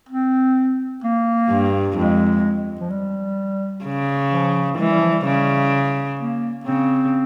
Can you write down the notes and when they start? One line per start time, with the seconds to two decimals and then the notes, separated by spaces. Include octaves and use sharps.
0.09 C4
1.04 A#3
1.49 G2
1.97 F2 G#3
2.80 F3
2.90 G3
3.85 C#3
4.32 F3
4.78 E3 G#3
4.90 G3
5.00 F3
5.12 G3
5.25 C#3
6.19 A#3
6.66 C#3 C4